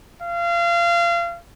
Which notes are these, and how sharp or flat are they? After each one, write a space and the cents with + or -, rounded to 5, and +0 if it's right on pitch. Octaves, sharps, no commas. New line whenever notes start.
F5 -30